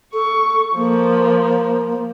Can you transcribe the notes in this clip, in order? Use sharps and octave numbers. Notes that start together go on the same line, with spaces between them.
A4 C#6
F3 A#3